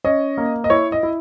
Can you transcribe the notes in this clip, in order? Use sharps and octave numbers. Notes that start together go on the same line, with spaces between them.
C#4 D#5
A#3
D#5
E4 C#5
D#5
E4